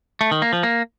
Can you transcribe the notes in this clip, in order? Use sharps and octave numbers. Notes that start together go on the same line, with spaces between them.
A3
D#3
A#3
F3
A#3